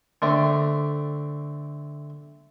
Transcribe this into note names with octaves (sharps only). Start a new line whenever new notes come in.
D3 A3 C4